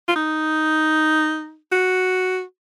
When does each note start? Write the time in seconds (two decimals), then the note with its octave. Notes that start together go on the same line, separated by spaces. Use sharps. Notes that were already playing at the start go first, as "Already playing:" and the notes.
0.08 F4
0.16 D#4
1.72 F#4